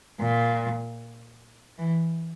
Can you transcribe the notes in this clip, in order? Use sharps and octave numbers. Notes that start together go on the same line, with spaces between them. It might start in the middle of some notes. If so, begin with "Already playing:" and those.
A#2
E3